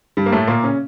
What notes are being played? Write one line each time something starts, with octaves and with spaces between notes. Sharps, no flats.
G2 G3
A#3
A2 A3
A#2 A#3
C#3 C#4